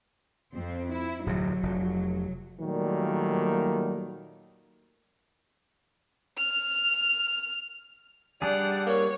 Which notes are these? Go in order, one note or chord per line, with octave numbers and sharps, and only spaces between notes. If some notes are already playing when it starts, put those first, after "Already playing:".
F2 C4
E4
D1 F2 C3 F#3
F1
A#2 D#3 F#3 G3 A3 A#3
F6
G3 D4 G#4 D5 F#5
A#3 C#5